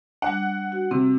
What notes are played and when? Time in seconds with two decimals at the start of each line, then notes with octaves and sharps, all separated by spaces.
0.22 G3 D4 F#5
0.72 F#4
0.91 C3 C4